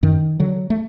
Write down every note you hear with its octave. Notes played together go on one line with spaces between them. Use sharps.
F#2 D#3
D3 F#3
A3